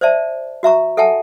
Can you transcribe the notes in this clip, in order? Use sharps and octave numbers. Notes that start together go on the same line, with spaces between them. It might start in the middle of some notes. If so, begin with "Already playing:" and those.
C5 D5 E5 A5
F#4 E5 A#5 C#6
A4 E5 F#5 G#5 A5